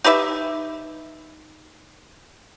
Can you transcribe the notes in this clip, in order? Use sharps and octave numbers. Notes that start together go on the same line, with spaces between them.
D#4 G4 B4 E5